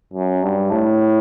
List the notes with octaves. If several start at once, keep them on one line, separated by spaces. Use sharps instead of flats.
F#2
G2
A2